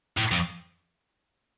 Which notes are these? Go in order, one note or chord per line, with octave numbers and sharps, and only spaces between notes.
A2
F2